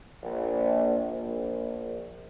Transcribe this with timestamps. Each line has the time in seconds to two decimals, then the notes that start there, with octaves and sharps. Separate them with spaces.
0.23 A#1
1.08 A#1